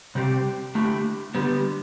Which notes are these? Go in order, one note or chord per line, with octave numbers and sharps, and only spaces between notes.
C3 G3 C4 G4
D3 A3 E4 G4
D3 G3 B3